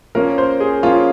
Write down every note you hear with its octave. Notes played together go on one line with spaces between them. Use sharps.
F3 A#3 C#4 A#4
C5
G#4
F3 A#3 C#4 F4